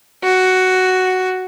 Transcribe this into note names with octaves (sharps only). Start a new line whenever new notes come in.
F#4